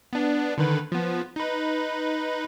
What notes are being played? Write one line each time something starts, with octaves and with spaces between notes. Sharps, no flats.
B3 D4
D3 D#3 B4
F3 B3
D#4 B4